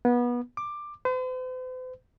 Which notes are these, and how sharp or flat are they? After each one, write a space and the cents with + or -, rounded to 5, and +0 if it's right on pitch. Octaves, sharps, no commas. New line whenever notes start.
B3 -25
D6 +15
C5 -45